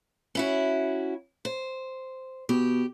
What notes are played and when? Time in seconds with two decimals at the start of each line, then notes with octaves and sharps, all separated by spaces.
0.35 C#4 E4 F#4
1.45 C5
2.49 B2 G4